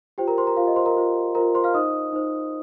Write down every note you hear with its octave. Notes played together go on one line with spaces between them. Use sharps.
F4 G4 C5 G5
A#4 A#5
C5 C6
A#4 A#5
F4 C5 F5
D#5
C5 C6
A#4 A#5
F4 C5
F4 A#4 C5 A#5
C5 C6
F5 F6
D#4 C5 D#5 D#6
D#4 C5